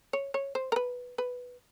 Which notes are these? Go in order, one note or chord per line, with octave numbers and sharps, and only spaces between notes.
C#5
C#5
C5
A#4
B4
B4